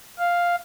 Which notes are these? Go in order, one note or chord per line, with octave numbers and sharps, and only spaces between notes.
F5